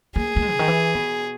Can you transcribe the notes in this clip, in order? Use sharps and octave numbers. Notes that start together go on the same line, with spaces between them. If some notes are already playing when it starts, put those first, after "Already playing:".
A#3 G#4
A#3
G#3
C#3
D#3
E3
B2